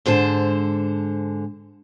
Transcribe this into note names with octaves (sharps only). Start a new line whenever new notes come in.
G#2 D3 C5 A5